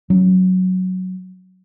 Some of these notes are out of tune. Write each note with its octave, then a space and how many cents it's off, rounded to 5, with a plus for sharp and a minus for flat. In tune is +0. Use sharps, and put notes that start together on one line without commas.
F#3 +0 C#4 +0